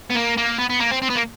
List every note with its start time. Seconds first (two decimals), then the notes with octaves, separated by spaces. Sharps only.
0.10 B3
0.15 A#3
0.37 A#3
0.58 B3
0.69 B3
0.80 A#3
0.91 C4
1.02 C4
1.10 B3
1.16 A#3